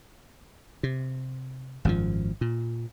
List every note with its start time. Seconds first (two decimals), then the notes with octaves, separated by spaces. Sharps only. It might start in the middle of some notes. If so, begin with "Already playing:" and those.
0.83 C3
1.85 G#1 F#2 B2 F3
2.41 A#2